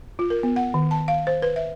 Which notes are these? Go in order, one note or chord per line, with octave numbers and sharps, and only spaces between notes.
F4
A#4
B3
F#5
D#3
A5
F5
C5
B4
E5